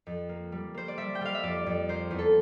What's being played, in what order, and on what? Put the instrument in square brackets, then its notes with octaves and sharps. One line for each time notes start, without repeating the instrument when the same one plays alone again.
[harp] F2
A#3
G3
A#3 C5
D5
G3 E5
G5
G3 F5
E5
F2 D5
F2
A#3 C5
E2
A4